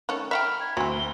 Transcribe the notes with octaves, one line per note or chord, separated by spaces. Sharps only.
D#3 A3 C#4
E5 F#5 G5 A#5 B5 F6 B6
G#6
D2 F#3 C4 E5 C6
G7